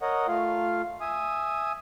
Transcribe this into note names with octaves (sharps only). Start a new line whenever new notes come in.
A#4 C#5 D#5 F#5
A3 F4 F5
E5 G#5 D#6